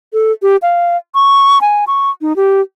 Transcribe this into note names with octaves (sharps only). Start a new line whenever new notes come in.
A4
G4
F5
C#6
G#5
C#6
D#4
G4